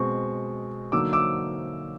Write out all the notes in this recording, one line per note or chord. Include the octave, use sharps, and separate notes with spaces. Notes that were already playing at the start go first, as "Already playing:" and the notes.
Already playing: B2 G#3 C4 C#6
D3 F#3 A#3 D#4 D6 E6
D6 E6